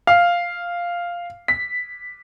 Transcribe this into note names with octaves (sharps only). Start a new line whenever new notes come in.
F5
B6